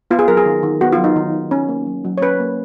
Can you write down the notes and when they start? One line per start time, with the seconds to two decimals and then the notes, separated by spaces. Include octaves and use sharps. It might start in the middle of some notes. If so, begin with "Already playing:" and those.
0.11 B3 F4
0.19 G#4
0.28 F#3 A#4
0.37 G#4
0.46 D#3
0.63 D#3
0.81 B3 F#4
0.92 F4
0.98 F#3
1.04 D#4
1.16 D#3
1.33 D#3
1.51 C#4
1.69 A#3
1.87 F#3
2.05 F#3
2.18 C#5
2.22 C#4 B4
2.40 A#3